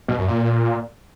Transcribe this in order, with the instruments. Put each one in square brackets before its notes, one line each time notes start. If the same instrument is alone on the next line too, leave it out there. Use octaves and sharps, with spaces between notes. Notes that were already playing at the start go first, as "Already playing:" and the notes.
[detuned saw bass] B2
F#2
A#2